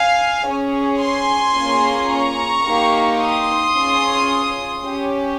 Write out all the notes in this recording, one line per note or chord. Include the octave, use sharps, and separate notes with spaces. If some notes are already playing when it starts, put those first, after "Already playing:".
Already playing: F5 G#5
C#4 G#4
G#5 C6
A#3 C#4 F4 G#4
A#5 C#6
A#3 D#4 G4
C6 D#6
C#4 F4 G#4
C#4 G4